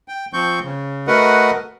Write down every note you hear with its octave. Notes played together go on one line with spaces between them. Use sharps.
G5
F3 C4 C#6 G6
C#3
A3 F#4 A#4 B4 D#5 F#5